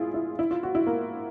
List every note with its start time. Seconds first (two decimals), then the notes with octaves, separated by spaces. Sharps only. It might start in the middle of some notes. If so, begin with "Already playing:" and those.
Already playing: E4 F4 G#4
0.14 E4
0.39 E4
0.51 F4
0.63 F#4
0.75 E4
0.87 A#3